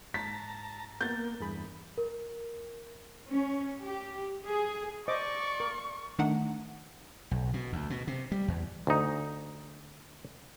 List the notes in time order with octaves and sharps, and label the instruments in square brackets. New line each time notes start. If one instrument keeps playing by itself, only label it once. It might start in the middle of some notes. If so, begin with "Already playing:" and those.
[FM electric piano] G#2 [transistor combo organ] A5 A#5 [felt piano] B6
[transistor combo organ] A#3 A#4 [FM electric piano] B3 [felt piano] G6 A6
[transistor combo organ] E2 [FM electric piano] G2 G#4 B5
[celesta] A#4
[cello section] C#4
G4
G#4
[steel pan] C5 D#5 D6 [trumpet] D5 [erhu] C#6
[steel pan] A#4
[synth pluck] D#3 A3 D4 D#4 F#5
[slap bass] B1
B2
D2
B2
C3
G3
E2
[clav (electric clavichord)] D2 D#4